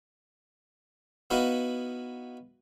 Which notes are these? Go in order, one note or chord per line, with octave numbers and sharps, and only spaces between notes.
B3 D#4 E4 F#4 B4 F5